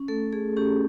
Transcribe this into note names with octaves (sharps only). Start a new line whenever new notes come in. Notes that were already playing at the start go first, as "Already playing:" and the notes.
Already playing: C#4
A3 A4
A3 G#4
C#4 G4